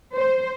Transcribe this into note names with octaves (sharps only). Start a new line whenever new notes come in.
C5